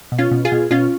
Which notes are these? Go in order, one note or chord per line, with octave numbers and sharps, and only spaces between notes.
B2
C#4 F4
B2
F4 G#4
B2
B2 C#4 F4